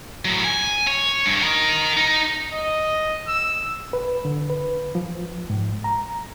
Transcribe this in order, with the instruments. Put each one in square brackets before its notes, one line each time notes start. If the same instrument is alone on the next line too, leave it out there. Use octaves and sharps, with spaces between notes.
[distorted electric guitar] A2 F#3
G#5
C#5
G2
A#4 D#5
D#4
[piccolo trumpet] D#5
E6
[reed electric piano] B4
D3
B4
F3
G#2
A#5